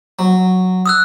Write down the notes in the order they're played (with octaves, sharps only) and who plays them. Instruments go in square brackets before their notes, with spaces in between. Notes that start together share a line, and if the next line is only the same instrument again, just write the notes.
[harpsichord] F#3
[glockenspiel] D#6 E6 F#6